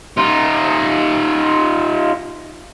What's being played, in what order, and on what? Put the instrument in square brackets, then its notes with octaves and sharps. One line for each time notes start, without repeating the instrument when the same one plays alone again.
[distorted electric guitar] D#4 F4